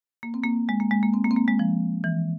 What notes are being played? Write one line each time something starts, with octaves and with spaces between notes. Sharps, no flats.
A#3
C4
A#3
G#3
A#3
G#3
A#3
C4
A#3
C4
A#3
G#3
F3
E3